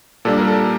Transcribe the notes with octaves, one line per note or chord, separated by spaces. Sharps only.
A#2 G3 D4 A4
A#4
A4